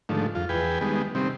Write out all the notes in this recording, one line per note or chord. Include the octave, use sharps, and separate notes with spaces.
G#2 D3 D#3 F3 A3
F2 F4
E2 G#4 B4 G5
D#3 G3 G#3 B3
C3 D#3 G3 C4